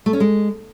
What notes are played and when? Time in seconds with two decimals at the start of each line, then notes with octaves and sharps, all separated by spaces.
0.06 A3
0.13 C#4
0.20 G#3